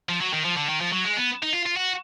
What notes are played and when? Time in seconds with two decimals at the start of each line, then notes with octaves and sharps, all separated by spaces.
0.09 F3
0.21 F#3
0.33 D#3
0.45 F3
0.57 D3
0.70 D#3
0.81 F3
0.93 F#3
1.05 G#3
1.17 B3
1.42 D#4
1.53 F4
1.66 F4
1.76 F#4